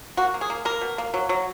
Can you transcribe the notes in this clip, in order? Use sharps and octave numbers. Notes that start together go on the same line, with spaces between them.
A#3 F#4
A#3
G#4
A#3
A#3 A#4
B2
A#3
F#3
F#3